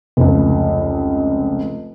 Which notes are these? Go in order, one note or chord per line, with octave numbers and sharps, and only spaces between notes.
F1 C#2